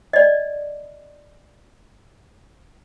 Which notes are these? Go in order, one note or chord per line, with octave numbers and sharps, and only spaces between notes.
D5 D#5